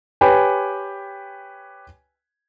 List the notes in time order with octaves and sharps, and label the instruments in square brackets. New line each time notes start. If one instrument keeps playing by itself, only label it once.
[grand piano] G4 B4 C#5 G5 G#5